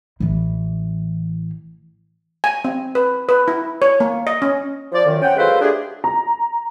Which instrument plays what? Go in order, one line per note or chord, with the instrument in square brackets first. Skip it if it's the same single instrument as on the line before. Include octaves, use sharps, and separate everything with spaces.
[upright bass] A1 E3
[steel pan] G#5
C4
B4
B4
E4
C#5
A#3
D#5
C#4
[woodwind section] F3 D5
F#2 D#3
C4 C#4 F#5 G5
F#3 G#3 F4 A4 B4 C5
A3 D4 G4 G#4
[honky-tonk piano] A#5